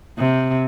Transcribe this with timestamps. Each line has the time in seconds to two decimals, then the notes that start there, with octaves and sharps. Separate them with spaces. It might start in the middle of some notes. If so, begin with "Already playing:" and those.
0.18 C3